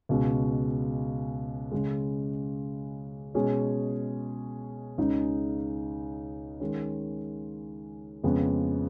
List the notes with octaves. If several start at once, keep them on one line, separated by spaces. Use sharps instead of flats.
C#2 B2 G#3
C#2 C#3 G#3
B2 G#3 C#4 G#4
C#2 C#3 G#3 D#4
D#3 G#3 C#4
F2 C#3 G#3 B3